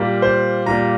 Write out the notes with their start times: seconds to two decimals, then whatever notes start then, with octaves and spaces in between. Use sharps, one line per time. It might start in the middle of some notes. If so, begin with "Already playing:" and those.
Already playing: A#2 G3 A#3
0.22 C5
0.66 A#2 G3 A#3 A#5